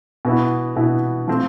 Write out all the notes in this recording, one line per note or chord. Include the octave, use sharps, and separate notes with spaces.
B2 B3 E4
B2 B3 E4
F3 A3 C4